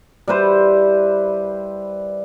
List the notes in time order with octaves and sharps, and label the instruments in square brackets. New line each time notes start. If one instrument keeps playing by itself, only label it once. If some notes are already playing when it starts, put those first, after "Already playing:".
[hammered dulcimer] G3 E4 B4 C5